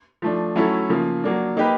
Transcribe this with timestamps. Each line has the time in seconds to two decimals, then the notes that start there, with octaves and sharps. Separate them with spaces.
0.22 F3 A3 D4
0.56 F#3 A3 C#4 E4 A4
0.89 C#3 F3 A#3
1.23 F#3 A#3 D4
1.57 A#3 D#4 G4 B4